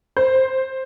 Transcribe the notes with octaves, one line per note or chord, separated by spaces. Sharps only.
C5